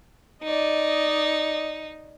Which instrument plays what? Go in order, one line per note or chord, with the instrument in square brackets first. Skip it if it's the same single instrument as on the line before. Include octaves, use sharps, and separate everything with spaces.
[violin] D#4 [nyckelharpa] D5 D#5